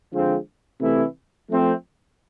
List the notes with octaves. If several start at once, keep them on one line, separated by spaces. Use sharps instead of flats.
D3 F3 G#3 C4
C3 E3 A3 E4
F3 A3 C4